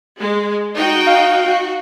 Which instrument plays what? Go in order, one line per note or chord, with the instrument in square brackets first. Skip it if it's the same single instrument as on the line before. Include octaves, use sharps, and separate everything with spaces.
[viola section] G#3
D#4 F#4 G5
[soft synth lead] F5
[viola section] F#4